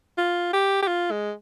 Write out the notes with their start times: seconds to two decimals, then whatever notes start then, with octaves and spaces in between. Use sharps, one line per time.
0.18 F4
0.53 G4
0.82 G4
0.88 F4
1.11 G#3